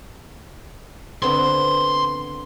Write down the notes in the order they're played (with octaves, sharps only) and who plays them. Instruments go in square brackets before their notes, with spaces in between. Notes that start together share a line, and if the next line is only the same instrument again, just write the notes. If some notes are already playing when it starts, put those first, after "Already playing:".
[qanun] D3 B3 C4 [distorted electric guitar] C6